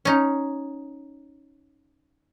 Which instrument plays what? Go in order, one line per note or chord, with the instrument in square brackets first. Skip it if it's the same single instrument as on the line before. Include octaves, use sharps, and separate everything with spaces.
[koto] C#4 D#4